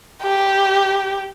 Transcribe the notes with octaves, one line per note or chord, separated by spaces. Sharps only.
G4